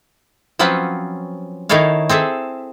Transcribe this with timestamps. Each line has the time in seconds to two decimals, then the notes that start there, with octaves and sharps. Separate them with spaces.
0.59 F3 F#3 C4 C#4 F4 B4
1.69 D#3 D#4 E4 A4 C#5 F5
2.09 C4 G#4 A4 E5